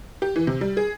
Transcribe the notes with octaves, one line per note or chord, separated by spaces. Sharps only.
G4
E3
C3
G3
G#4